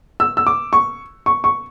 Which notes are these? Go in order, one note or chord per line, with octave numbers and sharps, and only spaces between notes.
E6
E6
D6
C#6
C#6
C#6